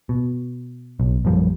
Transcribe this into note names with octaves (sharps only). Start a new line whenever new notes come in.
B2
B1
A#1 F#2 F3 G3